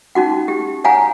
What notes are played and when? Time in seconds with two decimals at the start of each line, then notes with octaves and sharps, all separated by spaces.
0.15 C#4 D#4 F#4 F#5
0.48 G4
0.84 C#5 F5 F#5 G#5 A#5